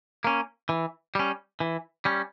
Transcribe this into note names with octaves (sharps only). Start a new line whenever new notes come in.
A#3 C#4
E3
G3 C#4
E3
G3 C#4